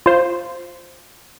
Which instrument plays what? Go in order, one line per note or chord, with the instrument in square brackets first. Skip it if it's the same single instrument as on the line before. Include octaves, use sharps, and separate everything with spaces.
[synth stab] F4 C5